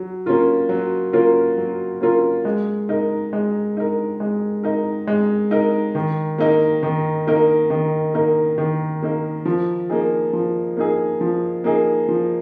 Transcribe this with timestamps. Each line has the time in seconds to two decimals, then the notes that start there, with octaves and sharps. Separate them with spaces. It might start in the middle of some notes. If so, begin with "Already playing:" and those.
Already playing: F#3
0.26 A#3 C#4 F4 A#4
0.69 F#3
1.13 A#3 C#4 F4 A#4
1.58 F#3
2.01 A#3 C#4 F4 A#4
2.45 G#3
2.89 D#4 A#4
3.33 G#3
3.77 D#4 A#4
4.20 G#3
4.63 D#4 A#4
5.07 G#3
5.51 D#4 A#4
5.95 D#3
6.38 A#3 D#4 A#4
6.83 D#3
7.27 A#3 D#4 A#4
7.70 D#3
8.14 A#3 D#4 A#4
8.58 D#3
9.02 A#3 D#4 A#4
9.45 F3
9.90 A#3 D#4 G#4
10.33 F3
10.77 A#3 D#4 G#4
11.21 F3
11.64 A#3 D#4 G#4
12.08 F3